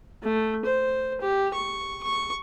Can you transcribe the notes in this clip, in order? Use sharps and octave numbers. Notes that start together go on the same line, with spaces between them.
A3
C5
G4
C#6
C#6